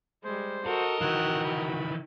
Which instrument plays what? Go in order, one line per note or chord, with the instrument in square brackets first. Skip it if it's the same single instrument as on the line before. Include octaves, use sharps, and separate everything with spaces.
[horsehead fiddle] G3 G#3 [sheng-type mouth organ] C5
[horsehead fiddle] F#4 [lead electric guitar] A4 [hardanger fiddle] A#4 D#5
[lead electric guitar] D#3 E3 [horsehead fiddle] F#4 [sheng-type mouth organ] E6 F#6
[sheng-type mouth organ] B5